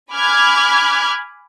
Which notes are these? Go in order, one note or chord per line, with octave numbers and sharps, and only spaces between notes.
G#5 B5 D6 F6 F#6 G#6